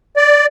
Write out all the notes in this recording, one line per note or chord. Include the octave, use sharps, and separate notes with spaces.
D5